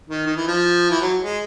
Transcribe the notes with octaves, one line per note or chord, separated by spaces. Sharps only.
D#3
D#3
E3
F3
E3
F#3
G#3